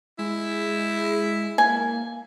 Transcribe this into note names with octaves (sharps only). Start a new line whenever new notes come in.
G#3 E4
A#3 G#5